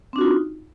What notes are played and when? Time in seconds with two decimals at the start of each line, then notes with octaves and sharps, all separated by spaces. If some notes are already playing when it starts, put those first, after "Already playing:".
0.13 C4
0.16 D4
0.18 F#4
0.21 F4
0.24 D#4